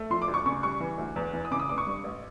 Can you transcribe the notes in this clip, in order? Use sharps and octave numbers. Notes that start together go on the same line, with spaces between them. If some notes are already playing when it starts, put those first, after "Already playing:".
Already playing: A3
F3 C6
D6
D2
C#6
C#3 C#6
G3 C#6
E3
D2
E2
E3
D#6
C#3 D6
D#6
F1 D6
C#6
G2
A1